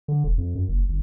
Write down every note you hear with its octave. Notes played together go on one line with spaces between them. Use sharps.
D3
E1
F2
F#2
F#1
G1